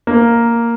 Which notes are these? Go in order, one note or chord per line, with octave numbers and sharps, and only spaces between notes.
A#3